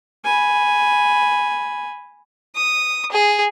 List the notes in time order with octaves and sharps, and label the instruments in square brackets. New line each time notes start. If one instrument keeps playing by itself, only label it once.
[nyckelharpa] G#5 B5
[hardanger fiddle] D#6
G#4